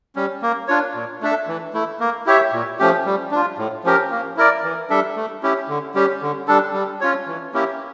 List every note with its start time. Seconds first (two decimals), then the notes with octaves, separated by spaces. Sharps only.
0.16 G3 C#4
0.42 A#3
0.68 D4 F4 C#5
0.95 A#2
1.21 A3 D4 A4 E5
1.48 E3
1.73 A3 E4
2.00 A#3
2.26 E4 G4 C#5 E5
2.53 A#2
2.79 F3 A3 C#4 G4
3.06 G3
3.31 D4 F4
3.58 A2
3.84 F3 C#4 G4 A#4
4.11 A#3
4.37 E4 A#4 D5
4.64 E3
4.90 G3 D4 A4 E5
5.16 A3
5.43 C#4 E4 G4
5.69 D3
5.95 G3 C#4 G4
6.22 D3
6.48 G3 D4 A4
6.74 G3
7.01 C#4 F4 C#5
7.27 E3
7.54 A#3 C#4 E4 G4